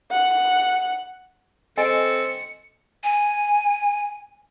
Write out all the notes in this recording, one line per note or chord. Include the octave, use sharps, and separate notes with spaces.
F#5
C4 A4 D#5 G#5 C#7
G#5